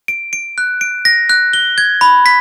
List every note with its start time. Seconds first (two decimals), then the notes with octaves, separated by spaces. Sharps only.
0.08 D7
0.33 D7
0.58 F#6
0.81 D7
1.05 A#6
1.29 F#6
1.53 G7
1.78 G#6
2.01 B5
2.26 B6